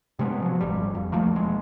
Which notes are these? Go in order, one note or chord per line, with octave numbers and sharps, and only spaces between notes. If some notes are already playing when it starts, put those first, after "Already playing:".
C3 G#3 A3 B3
F3 F#3
D#1 G#1 G3
F2
B1 F3 A3 A#3
E1 G#3